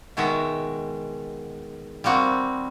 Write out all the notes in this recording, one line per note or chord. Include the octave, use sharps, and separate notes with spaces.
B2 D#3 G#3 F#4 E5
G3 A#3 C4 F#4